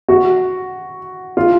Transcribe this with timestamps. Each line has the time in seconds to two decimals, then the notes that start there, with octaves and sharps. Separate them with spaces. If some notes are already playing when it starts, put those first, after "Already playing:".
0.08 F#4
1.37 F4